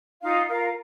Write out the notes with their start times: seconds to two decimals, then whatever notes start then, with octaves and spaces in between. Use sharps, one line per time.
0.21 D#4 F4 F5
0.48 F4 A#4 F5